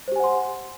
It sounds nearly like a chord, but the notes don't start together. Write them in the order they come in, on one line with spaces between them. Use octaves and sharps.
C5 G4 G#5 F#5 C6